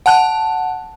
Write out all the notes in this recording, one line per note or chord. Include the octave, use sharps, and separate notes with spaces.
F#5 A5 F#6